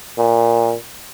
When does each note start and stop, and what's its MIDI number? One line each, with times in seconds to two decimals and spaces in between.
0.18 0.74 46